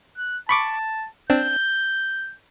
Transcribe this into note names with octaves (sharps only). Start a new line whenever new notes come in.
F#6
A5 B5 C#6 D6
C4 D4 G6